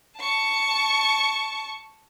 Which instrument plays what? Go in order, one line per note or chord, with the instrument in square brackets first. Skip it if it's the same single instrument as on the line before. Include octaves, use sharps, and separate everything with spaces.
[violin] A5 C#6